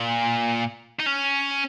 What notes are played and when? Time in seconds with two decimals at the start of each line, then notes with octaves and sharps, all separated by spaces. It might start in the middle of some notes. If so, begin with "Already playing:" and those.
Already playing: A#2
1.00 D#4
1.07 C#4